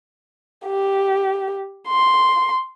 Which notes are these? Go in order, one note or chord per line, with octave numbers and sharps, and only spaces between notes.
G4
C6